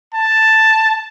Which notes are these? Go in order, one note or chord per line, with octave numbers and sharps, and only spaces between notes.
A5